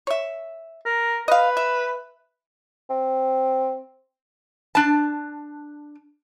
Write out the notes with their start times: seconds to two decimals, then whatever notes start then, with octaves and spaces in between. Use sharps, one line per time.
0.07 C#5 E5
0.86 A#4
1.28 B4 D#5 F5
1.57 E5
2.90 C4
4.75 D4 A5